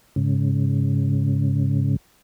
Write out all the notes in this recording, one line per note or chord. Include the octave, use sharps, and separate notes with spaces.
G#2 C#3